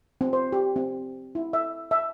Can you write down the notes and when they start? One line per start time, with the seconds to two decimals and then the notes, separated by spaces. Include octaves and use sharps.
0.21 C4
0.33 C5
0.52 G4
0.76 C4
1.35 E4
1.53 E5
1.91 E5